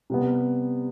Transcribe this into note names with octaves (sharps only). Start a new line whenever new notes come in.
C3 G3 B3